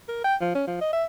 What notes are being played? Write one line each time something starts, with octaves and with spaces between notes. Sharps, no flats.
A#4
G5
F3
C#4
F3
D#5
E5